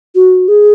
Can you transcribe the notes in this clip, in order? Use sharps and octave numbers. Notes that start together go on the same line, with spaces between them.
F#4
G#4